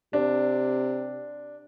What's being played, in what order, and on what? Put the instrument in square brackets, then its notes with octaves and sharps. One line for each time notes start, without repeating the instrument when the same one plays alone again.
[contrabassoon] C3 [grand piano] D4